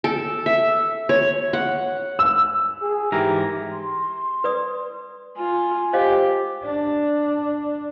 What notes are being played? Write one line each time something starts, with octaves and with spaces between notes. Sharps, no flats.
A4
E5
C#5
F#5
E6
G#4
G#2 E3 G4 A#4
C6
B4 D5 D#6
F4 G#5
G4 C5 D#5 F5
D4